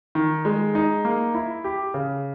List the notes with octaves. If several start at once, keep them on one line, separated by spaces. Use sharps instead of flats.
D#3
G#3
D#4
A#3
E4
G4
C#3